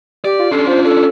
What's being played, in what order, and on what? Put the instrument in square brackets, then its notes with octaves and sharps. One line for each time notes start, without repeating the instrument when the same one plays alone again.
[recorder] G4 [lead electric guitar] D5
[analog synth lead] F4
[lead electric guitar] C#4 D4 [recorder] A4 [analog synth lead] C6
[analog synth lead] F4 [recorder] C5
[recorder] A4